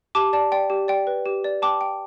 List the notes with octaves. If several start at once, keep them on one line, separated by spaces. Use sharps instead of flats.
G4 A5 D6
D5 A5
D5 G5
G4
D5 G5
B4
G4
D5
G5 A5 D6
G5